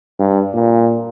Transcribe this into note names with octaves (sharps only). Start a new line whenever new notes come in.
G2
A#2